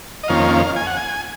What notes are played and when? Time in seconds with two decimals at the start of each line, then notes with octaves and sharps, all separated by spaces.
0.23 D#5
0.28 F2 D#3 A#3 C#4 F5
0.76 G#5
0.87 F#5
0.97 G#5